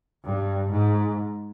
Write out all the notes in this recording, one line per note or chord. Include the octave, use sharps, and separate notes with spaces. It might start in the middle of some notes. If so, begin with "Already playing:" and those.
G2
G#2